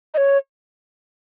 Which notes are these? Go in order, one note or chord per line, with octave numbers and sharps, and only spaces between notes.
D#5
C#5